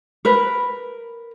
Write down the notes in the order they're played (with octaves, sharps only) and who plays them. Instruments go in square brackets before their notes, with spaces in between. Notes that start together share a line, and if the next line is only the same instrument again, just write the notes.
[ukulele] A#4 B4